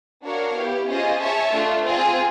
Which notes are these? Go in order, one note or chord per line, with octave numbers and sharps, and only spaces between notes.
D4 F#4 A#4 C#5 F5
B3 E4 G4
C#4 F4 G#4 C5 D#5
G#4 C#5 E5 A5
A3 D4 F4
C4 F4 G#4